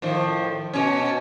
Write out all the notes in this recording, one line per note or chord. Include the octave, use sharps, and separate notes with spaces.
A2 D#3 F3
B2 C#4